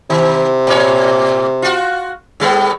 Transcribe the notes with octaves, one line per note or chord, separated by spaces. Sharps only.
C3 D#3
A2 C#5
F4 F#4
A2 G3 B3